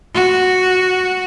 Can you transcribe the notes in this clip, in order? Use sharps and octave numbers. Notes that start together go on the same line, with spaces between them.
F#4